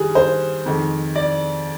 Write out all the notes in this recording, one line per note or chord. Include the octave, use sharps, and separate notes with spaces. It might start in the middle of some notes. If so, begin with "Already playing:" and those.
Already playing: G2 D#3 G3 G#4
C5
F2 D#3 G#3
D5